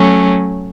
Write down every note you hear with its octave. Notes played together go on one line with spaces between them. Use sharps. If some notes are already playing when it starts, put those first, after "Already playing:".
Already playing: F#3 A3 C#4